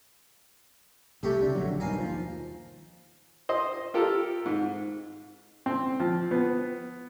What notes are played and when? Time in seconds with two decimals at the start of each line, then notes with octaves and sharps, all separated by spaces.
1.23 C2 C3 A3 G4 C#5
1.42 C#3 D4
1.55 A#1 D3 F#3
1.80 B1 G2 D#3 F5 G#5 A#5
1.99 D#2 F3
3.49 C5 D#5
3.94 F4 G4 A4 A#4
4.46 G#2
5.66 C4
6.00 F3
6.31 B3